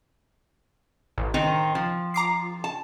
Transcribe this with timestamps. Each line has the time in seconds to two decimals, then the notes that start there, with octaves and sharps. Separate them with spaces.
1.18 A1
1.34 D#3 C4 D#4
1.75 F3
2.14 A#5 D6 C7
2.64 A5